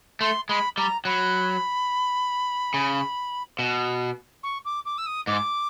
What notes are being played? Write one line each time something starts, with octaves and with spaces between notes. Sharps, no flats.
A3 C6
G#3 B5
G3 A#5
F#3 B5
C#3
B2
C#6
D6
D6
E6
D#6
G#2 D6